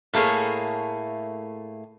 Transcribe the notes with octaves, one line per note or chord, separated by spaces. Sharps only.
A2 A3 A#3 G#4 C#5